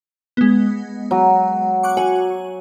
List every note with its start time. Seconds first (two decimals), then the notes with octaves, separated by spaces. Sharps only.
0.37 G#3 B3
1.11 F#3
1.83 C#6 D6 F#6
1.97 F#4 G#5